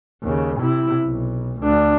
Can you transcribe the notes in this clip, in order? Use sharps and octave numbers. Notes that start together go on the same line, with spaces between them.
D#2 C#3
C3 E4
B1
D2 D4